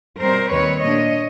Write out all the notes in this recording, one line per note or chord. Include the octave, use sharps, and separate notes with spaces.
B2 G3 C4 A#4 C5
D#2 D#3 G3 C4 B4 C#5
A#2 G3 A#3 D4 C#5 D#5